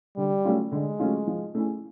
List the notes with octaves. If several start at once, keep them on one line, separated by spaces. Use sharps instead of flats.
D3 G3
F#3 A3 C#4 F4
D3 G#3
F#3 A3 C#4 F4
F3
A3 C#4 E4 G#4